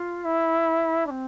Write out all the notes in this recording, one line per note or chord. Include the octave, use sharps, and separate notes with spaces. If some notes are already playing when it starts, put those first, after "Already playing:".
Already playing: F4
E4
D4
C4